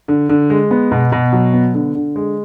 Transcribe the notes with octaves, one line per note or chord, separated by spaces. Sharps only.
D3
D3
G#3
B3
B2
B2
F#3
B3
D3
D3
G#3